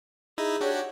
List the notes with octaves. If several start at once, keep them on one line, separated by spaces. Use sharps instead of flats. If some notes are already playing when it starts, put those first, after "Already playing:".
D#4 E4 G#4 D#5
D4 F#4 G4 C#5
F#5